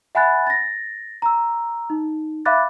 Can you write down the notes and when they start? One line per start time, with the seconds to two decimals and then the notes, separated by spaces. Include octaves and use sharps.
0.15 E5 F#5 G#5 B5 F#6 A6
0.47 A6 A#6
1.22 A#5 E6
1.90 D#4
2.45 E5 F5 B5 D6 F#6 A6